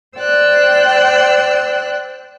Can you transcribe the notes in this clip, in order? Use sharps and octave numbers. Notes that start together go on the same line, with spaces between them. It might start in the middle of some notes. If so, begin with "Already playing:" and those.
C5 D5 G5 E6 F#6